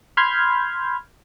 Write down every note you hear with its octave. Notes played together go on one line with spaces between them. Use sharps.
B5 C6 F6 G6 G#6